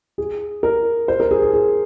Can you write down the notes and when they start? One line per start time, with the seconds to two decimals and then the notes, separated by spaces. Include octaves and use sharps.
0.18 G#4
0.63 A#4
1.08 C5
1.20 A#4
1.31 G#4
1.42 G#4
1.54 G#4